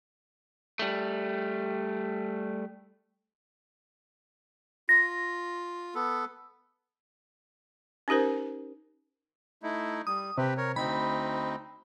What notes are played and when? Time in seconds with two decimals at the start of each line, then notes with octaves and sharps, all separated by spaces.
0.79 G3 A3
4.89 F4 A#6
5.95 B3 A4
8.08 C#4 D#4 G4 A#4 C5
9.63 A3 D#4 E4
10.07 G3 D#6
10.38 C3 C4 G4 B4
10.57 A#4 C#5
10.76 D2 C4 D#4 B5